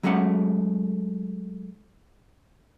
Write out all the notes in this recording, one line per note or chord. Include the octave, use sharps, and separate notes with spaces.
F#3 G#3 A3 C#4 F#5